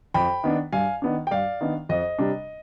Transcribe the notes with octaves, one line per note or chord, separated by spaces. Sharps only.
F2 G5 B5
D#3 B3 D4
G2 F5 G#5
D#3 B3 D4
G5
G2 D5 F5
D#3 B3 D4
F2 D#5
C3 G3 D4